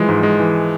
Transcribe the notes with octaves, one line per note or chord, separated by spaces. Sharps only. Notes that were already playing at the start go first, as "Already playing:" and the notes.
Already playing: E3 F3 G#3
G#2
G#3
E3